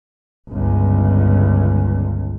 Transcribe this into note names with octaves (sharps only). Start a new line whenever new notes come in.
G1 C#2